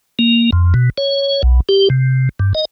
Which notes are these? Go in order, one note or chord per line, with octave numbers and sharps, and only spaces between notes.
A#3
F2
B2
C#5
B1
G4
C3
G2
D#5